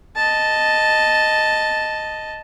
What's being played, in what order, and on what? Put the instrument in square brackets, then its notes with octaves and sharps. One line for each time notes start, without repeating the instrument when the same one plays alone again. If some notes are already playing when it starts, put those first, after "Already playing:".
[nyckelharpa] D#5 A5